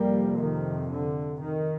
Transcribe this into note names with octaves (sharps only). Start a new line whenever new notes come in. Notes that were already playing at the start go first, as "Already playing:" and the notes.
Already playing: F2 C3 G3 A#3
D#3
D3
D#3